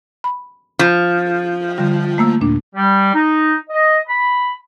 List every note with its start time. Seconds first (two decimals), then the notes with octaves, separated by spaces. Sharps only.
0.24 B5
0.79 F3
1.78 D3 G3 F4
2.18 A3 A#3 E6
2.41 D#2 A#2 D4
2.75 G3
3.14 D#4
3.69 D#5
4.08 B5